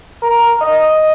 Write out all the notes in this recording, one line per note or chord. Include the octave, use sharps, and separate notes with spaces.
A#4
D#5